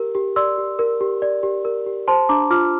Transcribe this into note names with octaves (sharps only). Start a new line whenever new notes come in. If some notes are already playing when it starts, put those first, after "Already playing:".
Already playing: G4 A#4
G4
D5 C6 E6
G4
A#4
G4
D5
G4
A#4
G4
C5 A5 C6
D4 A#5 D6
F4 D6 F6